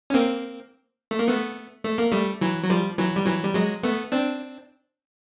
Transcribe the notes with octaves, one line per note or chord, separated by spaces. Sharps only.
C#4
A#3 C4
A3
A#3
A3 B3
A3
A#3
G3 A3
E3 F#3
F#3
F3 G3
E3 F#3
G3
E3 F#3
G3
F#3 G#3
A3 B3
C4 D4